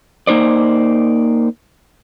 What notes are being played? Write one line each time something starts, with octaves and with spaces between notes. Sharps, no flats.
A#3 D#4 C5 D5